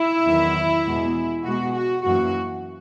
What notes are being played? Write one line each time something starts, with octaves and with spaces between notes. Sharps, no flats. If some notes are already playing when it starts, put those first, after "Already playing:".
Already playing: E4
E2 D#3 F#3
E2 B2 G#3 B3
B2 G#3 B3 F#4
F#4
F#2 E3 A#3 F#4